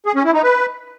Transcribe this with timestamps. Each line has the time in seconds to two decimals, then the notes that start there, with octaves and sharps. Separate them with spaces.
0.06 G#4
0.15 C#4
0.24 E4
0.34 D#4
0.43 B4